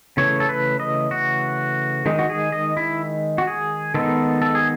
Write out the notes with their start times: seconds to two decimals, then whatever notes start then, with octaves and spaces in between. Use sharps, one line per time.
0.17 C#3 E3 A3 C#5
0.40 A4
0.49 B4
0.80 D#5
1.11 F#4
2.06 D#3 G#3 D#4
2.19 F#4
2.30 G#4
2.52 D#5
2.77 E4
3.38 F#4
3.47 G#4
3.94 D#3 G#3 B3 D#4 A4
4.42 A4
4.55 G#4